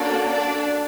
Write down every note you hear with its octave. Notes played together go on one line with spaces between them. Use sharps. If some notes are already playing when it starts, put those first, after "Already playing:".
Already playing: A#3 C#4 D4 F#4 A4 D5
D4 D5